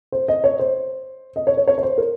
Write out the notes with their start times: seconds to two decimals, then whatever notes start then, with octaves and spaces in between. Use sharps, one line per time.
0.12 C5
0.28 D#5
0.44 C#5
0.59 C5
1.36 D#5
1.47 C#5
1.57 C#5
1.67 C#5
1.78 C#5
1.83 C5
1.98 A#4